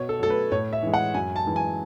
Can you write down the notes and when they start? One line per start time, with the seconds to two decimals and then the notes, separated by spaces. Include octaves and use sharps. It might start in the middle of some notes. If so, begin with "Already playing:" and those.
Already playing: B2 C#5
0.09 A4
0.19 F#3 A3 A4
0.30 B4
0.52 A2 C#5
0.73 E5
0.83 E3 G#3
0.94 F#5
1.14 F#2 G#5
1.36 A5
1.46 E3 G#3
1.56 G#5